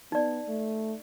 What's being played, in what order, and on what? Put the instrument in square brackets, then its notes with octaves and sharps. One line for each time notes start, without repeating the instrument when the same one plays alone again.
[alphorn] B3 [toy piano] D#4 D5
[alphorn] A3